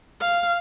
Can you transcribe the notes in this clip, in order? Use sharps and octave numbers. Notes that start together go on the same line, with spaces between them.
F5